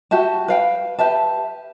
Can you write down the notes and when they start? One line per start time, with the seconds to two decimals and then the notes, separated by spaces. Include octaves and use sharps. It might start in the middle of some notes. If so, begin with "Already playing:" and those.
0.11 F#4 G4 E5 A5
0.48 B4 F5 G5
0.99 G4 B4 E5 A5